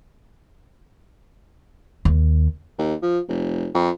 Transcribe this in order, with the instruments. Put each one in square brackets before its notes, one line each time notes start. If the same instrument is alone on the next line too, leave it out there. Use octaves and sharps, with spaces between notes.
[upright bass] D#2
[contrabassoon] D#2
F3
F1
F2